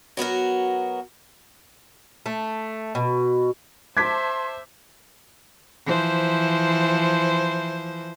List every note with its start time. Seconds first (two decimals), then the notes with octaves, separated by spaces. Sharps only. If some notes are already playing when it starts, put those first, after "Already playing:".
0.17 F#3 B3 F#4 A#4
2.26 A3
2.95 B2
3.97 C5 E5 A5 C6 D6 G#6 B6
5.86 E3 F3 C5